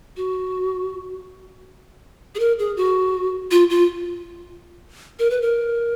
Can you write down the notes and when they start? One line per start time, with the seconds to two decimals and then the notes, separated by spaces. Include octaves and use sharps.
0.17 F#4
2.35 G#4
2.39 A#4
2.59 G#4
2.77 F#4
3.51 F4
3.70 F4
5.19 A#4
5.30 B4
5.42 A#4